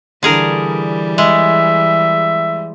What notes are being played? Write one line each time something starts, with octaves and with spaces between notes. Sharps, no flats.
D3 E3 G3 G#4 A#4
G#3 E5